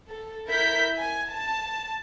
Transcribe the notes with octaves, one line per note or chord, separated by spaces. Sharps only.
A4
E4 A#4 G6 B6
G#5
A5